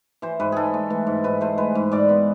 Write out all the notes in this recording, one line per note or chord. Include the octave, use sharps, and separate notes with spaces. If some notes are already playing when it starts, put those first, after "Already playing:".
E3 C5
G#2 B4
G#2 G#4 A4
A3
E3
G#2
G#2 B4
A3 C5
G#3 B4
G#2
G#2 D5
B3